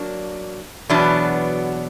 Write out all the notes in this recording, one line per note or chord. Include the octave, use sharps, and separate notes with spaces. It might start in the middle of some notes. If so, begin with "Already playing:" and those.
Already playing: F#3 A#3 D4
E2 B2 F#3 B3 D4